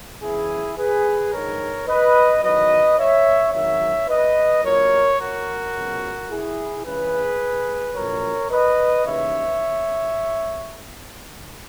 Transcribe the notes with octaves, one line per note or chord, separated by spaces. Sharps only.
E2 C#3 E3 E4 G#4
G#4 B4
A#1 G#2 D#3 A#4 C#5
B4 D#5
E2 D#3 F#3 B4 D#5
C#5 E5
G#1 F#2 D#3 F#3 C#5 E5
B4 D#5
A#1 A#2 F#3 A#4 C#5
F#4 A#4
C#2 B2 F#3
E4 G#4
C#2 C#3 E3 G#4 B4
A#1 A#2 F#3 A#4 C#5
B4 D#5
D#2 C#3 E3 C#5 E5